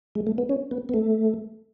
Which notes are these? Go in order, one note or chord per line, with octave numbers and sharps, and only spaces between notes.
G#3
A3
B3
C#4
B3
B3
A3